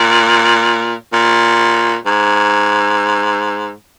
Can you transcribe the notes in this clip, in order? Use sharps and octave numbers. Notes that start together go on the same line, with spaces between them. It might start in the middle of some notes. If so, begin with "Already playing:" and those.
Already playing: A#2
A#2
G#2